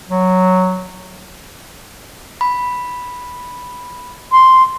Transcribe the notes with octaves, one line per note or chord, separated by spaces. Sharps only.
F#3
B5
C6